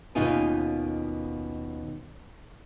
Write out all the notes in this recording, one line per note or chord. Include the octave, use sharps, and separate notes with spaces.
D#2 B2 C#4 D#4 F4 G#5